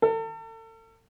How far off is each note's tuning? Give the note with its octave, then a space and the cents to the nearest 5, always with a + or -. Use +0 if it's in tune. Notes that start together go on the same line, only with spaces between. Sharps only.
A4 +35